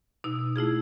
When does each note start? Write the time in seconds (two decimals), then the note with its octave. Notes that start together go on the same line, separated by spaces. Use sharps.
0.24 B2 D#4 E6
0.56 A3 E4 F4 G#4